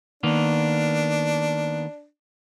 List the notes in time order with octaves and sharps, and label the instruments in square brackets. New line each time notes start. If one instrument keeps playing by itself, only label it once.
[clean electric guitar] D#3 A#3 B3 [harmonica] D4